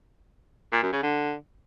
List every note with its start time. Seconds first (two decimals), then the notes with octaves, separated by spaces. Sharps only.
0.72 A#2
0.83 F#2
0.93 C#3
1.03 D3